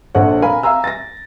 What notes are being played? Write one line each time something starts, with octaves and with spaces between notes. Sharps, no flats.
A#1 D3 C5 C#5 F#5
A#4 F5 G#5 B5
E5 F5 G#5 A#5 E6
A6 A#6